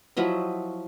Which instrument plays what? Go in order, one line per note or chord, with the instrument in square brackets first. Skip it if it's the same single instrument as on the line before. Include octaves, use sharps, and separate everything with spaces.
[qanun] F3 F#3 E4 D#5